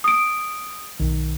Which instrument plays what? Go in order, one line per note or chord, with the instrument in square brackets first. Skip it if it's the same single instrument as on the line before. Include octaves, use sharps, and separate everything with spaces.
[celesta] D#6 D7
[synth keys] B1 D#3